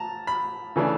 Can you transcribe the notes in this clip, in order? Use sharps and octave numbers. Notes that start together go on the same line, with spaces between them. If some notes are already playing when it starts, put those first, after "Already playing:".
Already playing: A5 A#5
B5
C#3 E3 A3 D4